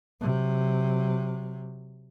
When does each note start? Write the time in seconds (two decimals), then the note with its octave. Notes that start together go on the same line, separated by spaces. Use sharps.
0.21 C3 F#3